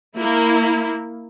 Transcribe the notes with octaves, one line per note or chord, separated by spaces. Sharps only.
A#3 E4